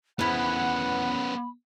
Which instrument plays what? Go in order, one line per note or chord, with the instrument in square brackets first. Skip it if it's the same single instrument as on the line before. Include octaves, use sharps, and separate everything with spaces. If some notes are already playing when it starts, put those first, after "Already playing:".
[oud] E2 E4 [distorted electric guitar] B3 C#4 [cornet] F#5 [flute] B5